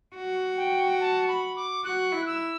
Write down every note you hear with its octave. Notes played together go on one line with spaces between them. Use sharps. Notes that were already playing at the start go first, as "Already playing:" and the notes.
F#4
G5
A5
B5
D6
F#4 F#6
E4
E6